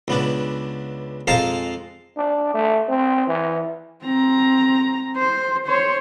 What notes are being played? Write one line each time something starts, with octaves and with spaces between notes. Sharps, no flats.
C#2 B3 D4
F2 G#3 C5 F5 A5 A#5
D4
A3
C4
E3
C4 A#5
C5
C5 C#5